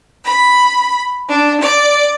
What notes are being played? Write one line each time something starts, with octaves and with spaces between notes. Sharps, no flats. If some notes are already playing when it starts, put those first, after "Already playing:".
B5
D4
D5